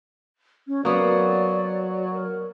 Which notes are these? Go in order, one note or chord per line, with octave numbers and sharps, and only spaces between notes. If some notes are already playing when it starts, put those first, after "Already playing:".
C#4
F#3 A#3 B3 D5
A#4